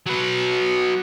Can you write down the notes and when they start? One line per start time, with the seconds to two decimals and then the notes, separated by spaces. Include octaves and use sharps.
0.06 F#3 B4